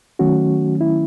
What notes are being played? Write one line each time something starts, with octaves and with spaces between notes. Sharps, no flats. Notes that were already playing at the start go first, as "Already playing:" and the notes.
D#3 F#3 A3 C#4 F#4
E4